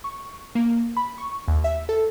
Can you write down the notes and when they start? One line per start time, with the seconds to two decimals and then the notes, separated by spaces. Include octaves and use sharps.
0.04 C#6
0.55 A#3
0.97 B5
1.18 C#6
1.48 D#2
1.64 E5
1.89 A4